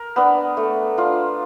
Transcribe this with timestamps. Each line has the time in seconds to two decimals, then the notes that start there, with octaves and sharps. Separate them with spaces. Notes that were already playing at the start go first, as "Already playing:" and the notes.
Already playing: A#4
0.16 B3 D4
0.57 A3
0.98 D4 F4